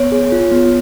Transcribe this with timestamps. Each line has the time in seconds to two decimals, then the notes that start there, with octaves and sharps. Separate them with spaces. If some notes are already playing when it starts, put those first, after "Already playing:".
Already playing: B3 C#5
0.12 G#4
0.32 F4
0.52 B3